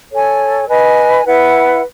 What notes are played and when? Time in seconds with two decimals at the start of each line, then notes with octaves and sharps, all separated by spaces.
0.12 A4 C#5 G#5
0.68 B4 D#5 G#5
1.25 E4 B4 F#5